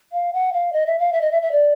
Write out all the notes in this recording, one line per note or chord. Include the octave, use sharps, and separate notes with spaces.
F5
F#5
F5
D#5
E5
F5
E5
D#5
E5
E5
D5